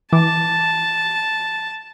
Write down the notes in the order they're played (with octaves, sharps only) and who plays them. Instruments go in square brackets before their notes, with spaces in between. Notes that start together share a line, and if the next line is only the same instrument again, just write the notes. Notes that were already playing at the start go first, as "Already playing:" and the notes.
[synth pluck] E3 D6 [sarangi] A5